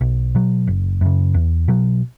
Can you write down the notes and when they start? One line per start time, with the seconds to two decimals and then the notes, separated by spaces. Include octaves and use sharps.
0.01 B1
0.35 B2 F#3
0.67 F#1
1.01 F#2 C#3
1.34 E2
1.68 B2 F#3